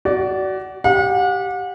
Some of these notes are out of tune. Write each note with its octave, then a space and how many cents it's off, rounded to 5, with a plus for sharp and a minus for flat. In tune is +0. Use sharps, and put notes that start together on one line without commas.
F#4 +25 D5 -15
G4 +0 F#5 -40